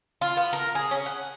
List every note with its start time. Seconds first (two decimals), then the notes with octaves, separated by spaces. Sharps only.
0.21 F4
0.37 B3
0.53 A#4
0.75 G#4
0.91 C#4
1.06 F#5